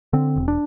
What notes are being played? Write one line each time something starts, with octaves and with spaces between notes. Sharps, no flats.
D3 C4
E1
D4